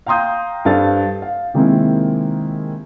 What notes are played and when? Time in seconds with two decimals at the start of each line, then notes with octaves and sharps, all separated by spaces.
0.06 F5 G5 A#5 C6 D#6 G6
0.65 G2 A4 C5 F5 A6
1.22 F5
1.54 C3 D#3 G#3 A#3 C4 E4